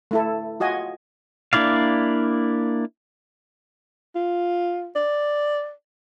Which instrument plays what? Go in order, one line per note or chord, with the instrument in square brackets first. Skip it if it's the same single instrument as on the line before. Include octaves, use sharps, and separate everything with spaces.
[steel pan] A3 E4 A4
F4 F#4 D#5 G#5
[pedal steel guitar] A#3 D4 E4 D5 F5
[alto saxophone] F4
D5